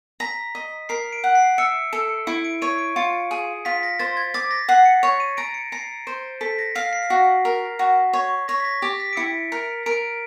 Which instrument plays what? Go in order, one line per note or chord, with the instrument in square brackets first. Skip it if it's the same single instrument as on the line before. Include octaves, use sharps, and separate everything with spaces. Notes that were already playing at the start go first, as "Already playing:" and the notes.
[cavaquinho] A#5 [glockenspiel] B6
[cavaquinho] D#5
[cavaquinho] A#4 [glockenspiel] C7
[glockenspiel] D7
[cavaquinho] F#5
[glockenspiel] C7
[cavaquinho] E5 [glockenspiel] C#7
[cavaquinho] A4
[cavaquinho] E4 [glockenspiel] D7
[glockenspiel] D7
[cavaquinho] C#5 [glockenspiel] D#7
[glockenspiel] D7
[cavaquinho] F4 [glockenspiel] C#7
[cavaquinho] G#4
[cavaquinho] F4 [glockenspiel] B6
[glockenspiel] A#6
[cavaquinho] C5 [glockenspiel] A6
[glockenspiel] G#6
[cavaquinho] D6 [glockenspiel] A6
[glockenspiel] A#6
[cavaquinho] F#5 [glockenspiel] C7
[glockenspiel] C#7
[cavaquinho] C#5
[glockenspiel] D#7
[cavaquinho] A#5 [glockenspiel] D7
[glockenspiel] C#7
[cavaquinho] A#5 [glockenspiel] C7
[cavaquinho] C5
[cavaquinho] A4 [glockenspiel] B6
[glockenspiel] A#6
[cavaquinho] F5 [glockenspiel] C7
[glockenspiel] C7
[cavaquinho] F#4
A#4
F#4
C#5
[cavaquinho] C#5 [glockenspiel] A#6
[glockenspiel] B6
A#6
[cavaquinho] G4 [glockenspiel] A6
[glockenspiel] B6
D7
[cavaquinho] E4 [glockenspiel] C#7
[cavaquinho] A#4
[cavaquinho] A#4 [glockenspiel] D7